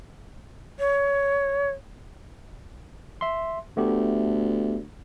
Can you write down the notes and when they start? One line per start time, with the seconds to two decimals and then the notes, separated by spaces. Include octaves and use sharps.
0.79 C#5
3.21 E5 C6
3.77 D2 A3 B3 G4